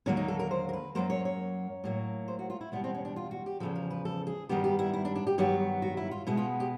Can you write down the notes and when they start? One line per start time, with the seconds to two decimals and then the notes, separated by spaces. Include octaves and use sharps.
0.06 D#2 D3 F#3 A#3 C#4
0.17 D#4
0.28 A4
0.39 A#4
0.51 C5
0.69 A#4
0.73 B4
0.95 F#2 D#3 F#3 A#3 C5
1.10 C#5
1.25 C#5
1.84 A2 F#3 A#3
2.28 C5
2.39 F#4
2.50 F4
2.61 E4
2.72 E2 B2 G3 B3
2.84 C4
2.95 C#4
3.05 D4
3.16 F4
3.31 F#4
3.46 G4
3.60 E2 C#3 F3 A4
3.76 A#4
3.91 B4
4.05 A4
4.27 G#4
4.49 G2 D#3 G3 B3 G4
4.64 G4
4.79 E4
4.94 E4
5.05 D4
5.16 D4
5.27 G4
5.38 G2 D#3 F#3 B3 G4
5.82 F#4
5.97 E4
6.11 F4
6.27 B2 G#3 B3 E4
6.37 F4
6.60 G4